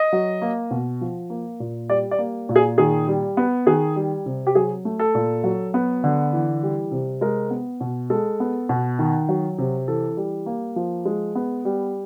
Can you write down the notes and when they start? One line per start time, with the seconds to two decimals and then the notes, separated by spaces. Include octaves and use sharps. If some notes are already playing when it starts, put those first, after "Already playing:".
Already playing: D#5
0.13 F#3
0.42 A#3
0.71 B2
1.01 F3
1.30 A#3
1.60 A#2
1.89 G3 D5
2.11 D5
2.19 A#3
2.49 A#2
2.56 G#4
2.78 D#3 G#4
3.08 G3
3.37 B3
3.67 D#3 G#4
3.96 G3
4.26 C3
4.47 G4
4.55 F#3 G#4
4.85 A3
4.99 A4
5.15 A#2
5.44 F#3
5.74 B3
6.04 D3
6.33 E3
6.63 G3
6.91 C3
7.21 G#3 A#4
7.50 B3
7.81 B2
8.10 G#3 A4
8.40 B3
8.69 B2
8.99 D#3
9.29 F#3
9.58 C3
9.88 E3 A4
10.17 G3
10.46 A#3
10.76 F3
11.06 G#3
11.35 B3
11.65 G3